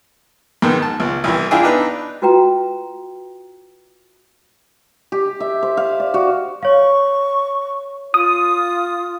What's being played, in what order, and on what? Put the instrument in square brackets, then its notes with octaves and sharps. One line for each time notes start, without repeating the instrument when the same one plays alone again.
[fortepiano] G#2 D#3 B3
A5
C#2
C2 E3
D4 E4 F4 G#4 G5 G#5
D4 D#4 B4
[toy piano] F4 F#4 B4 G5 A#5
[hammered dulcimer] G4
E5
C5
F5
D5
F#4
[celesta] C#5 F5 [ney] C#6
[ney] F4 [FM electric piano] D#6